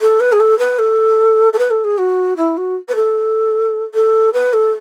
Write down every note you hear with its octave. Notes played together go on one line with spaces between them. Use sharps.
A4
B4
G#4
A4
B4
A4
A4
B4
A4
G#4
F#4
E4
F#4
B4
A4
A4
B4
A4